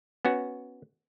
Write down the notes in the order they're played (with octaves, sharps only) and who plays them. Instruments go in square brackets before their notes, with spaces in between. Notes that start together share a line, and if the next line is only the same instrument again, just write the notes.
[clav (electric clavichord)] B3 C#4 F#4